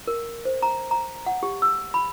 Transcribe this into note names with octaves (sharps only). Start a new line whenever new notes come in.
A#4
C5
A#5
A#5
F#5
G4
E6
B5